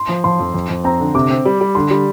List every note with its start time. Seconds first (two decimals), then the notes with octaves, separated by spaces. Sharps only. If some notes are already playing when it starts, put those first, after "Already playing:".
Already playing: C6
0.09 F3
0.24 F3 C6
0.39 F2
0.54 F2
0.70 F2
0.84 C4 A#5
1.00 D3
1.15 C3 D6
1.30 C4
1.45 G3
1.61 G3
1.75 D3 C6
1.91 G3